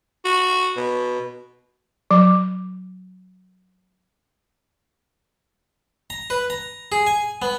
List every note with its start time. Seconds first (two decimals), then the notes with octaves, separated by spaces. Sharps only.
0.25 F#4
0.77 B2
2.11 F#3 D6
6.10 A#5
6.30 B4
6.50 A#5
6.92 G#4
7.07 G#5
7.42 B3